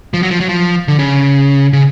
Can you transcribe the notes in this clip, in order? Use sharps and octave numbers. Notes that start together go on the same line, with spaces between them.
F3
F#3
F3
F#3
F3
D3
C#3
C#3